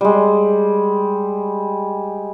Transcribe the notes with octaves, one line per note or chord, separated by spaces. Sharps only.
G3 G#3